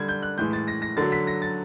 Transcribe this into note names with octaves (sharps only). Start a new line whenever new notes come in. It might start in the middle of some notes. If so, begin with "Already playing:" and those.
Already playing: D3 G3 G#6
G6
F#6
A2 E3 G#3 G6
A6
A#6
A#6
D3 F#3 A6
B6
A#6
A6